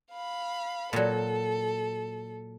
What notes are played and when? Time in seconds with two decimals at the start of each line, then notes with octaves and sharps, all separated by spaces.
0.11 F5 B5
0.93 A#2 F#3 A4